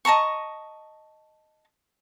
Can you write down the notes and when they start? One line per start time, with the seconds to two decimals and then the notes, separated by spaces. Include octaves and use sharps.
0.05 D#5 A5 A#5 C#6